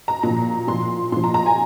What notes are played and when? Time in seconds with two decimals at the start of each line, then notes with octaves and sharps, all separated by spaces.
0.08 A#5
0.23 A#2 F3 A#5
0.67 A#2 F3 C6
1.12 A#2 C6
1.17 F3
1.24 A#5
1.34 A#5
1.46 G#5